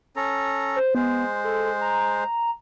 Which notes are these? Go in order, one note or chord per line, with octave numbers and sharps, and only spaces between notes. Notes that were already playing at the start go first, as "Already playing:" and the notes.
C#4 A4 A#5
C5
G#3 B3 C5
A4
A#5